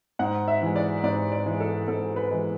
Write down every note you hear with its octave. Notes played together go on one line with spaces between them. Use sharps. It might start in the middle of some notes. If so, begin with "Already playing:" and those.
G#2 F#5
E5
E3 G#3
D5
G#2 D5
D5
E3 G#3
A4
G#2 A4
B4
E3 G#3